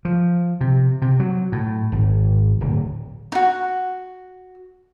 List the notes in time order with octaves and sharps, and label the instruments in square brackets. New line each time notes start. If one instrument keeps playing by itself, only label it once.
[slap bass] F3
C3
C3
F#3
A2
G#1
D1
[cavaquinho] D#4 F#4